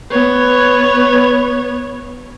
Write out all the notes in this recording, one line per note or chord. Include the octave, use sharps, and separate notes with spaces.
B3 C#5